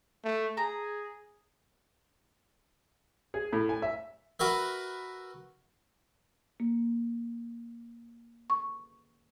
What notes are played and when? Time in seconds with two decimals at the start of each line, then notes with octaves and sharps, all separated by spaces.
0.24 A3
0.57 G#4 A#5
3.34 G#4
3.53 A2
3.69 G#5
3.82 E5
4.39 F#4 A#4 B4 E5
6.60 A#3
8.50 C#6